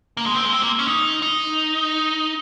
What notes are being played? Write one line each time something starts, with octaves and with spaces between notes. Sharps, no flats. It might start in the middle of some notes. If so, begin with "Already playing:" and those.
A#3
G#3
C4
G#3
C4
A#3
C#4
D#4
D#4